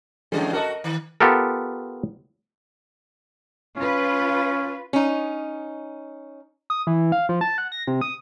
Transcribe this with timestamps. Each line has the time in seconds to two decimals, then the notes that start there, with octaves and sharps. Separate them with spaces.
0.32 E2 D3 F3 G#3 C#4
0.53 F#4 A4 A#4 D#5
0.84 D#3
1.20 B3 F4 G4 A4 A#4
3.77 C#4 F4 B4
4.93 C#4 D#4
6.70 D#6
6.87 E3
7.12 F5
7.29 F3
7.41 A5
7.58 F#5
7.72 A#6
7.87 C3
8.01 D#6